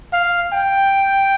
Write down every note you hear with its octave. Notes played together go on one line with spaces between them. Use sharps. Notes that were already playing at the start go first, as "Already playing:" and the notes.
F5
G5